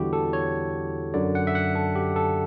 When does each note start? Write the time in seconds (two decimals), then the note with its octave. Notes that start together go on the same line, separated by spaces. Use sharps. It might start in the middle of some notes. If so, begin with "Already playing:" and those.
Already playing: E2 D3 G3 E4 F#4 G4
0.13 A4
0.33 C#5
1.14 F#2 D3 F#3 D5
1.35 F#5
1.47 E5
1.55 F#5
1.75 A4
1.95 G4
2.16 A4